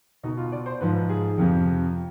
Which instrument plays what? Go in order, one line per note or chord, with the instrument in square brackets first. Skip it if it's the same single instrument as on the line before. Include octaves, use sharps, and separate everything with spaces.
[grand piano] B2 D#4
F4
D5
C5
G#2 F3 B4
G#4
F2 C3 F3